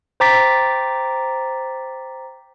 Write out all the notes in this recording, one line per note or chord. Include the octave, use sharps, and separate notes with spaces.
C5 G5 A#5 D6 A6 B6